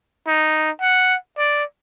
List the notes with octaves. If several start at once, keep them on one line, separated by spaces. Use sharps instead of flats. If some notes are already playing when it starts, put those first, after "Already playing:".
D#4
F#5
D5